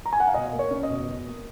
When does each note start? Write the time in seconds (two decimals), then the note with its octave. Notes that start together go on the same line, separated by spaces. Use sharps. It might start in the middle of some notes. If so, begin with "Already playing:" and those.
0.06 A#5
0.13 G#5
0.20 F#5
0.28 F5
0.34 B2 D#5
0.53 A#3
0.59 C#5
0.71 C#4
0.83 D#5
0.90 B2
1.08 B2
1.26 A#3